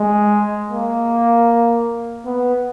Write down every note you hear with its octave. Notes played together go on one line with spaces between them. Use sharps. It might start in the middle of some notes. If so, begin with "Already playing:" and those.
Already playing: G#3
A#3
B3